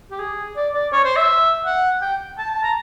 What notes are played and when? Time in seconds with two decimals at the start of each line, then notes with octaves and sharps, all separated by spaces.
0.11 G4
0.20 G#4
0.56 D5
0.74 D5
0.92 C#5
1.04 C5
1.16 E5
1.65 F#5
2.01 G5
2.38 A5
2.50 A5
2.63 A#5